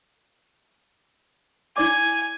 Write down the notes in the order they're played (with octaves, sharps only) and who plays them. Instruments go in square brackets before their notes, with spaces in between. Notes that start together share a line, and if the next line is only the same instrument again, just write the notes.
[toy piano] E4 D5 D6 [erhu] G#5